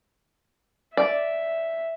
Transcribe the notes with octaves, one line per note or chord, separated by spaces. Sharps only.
D5 E5